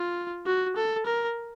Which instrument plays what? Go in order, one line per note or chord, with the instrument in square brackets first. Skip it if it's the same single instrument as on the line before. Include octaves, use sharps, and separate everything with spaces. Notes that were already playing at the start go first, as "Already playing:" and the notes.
Already playing: [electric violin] F4
F#4
A4
A#4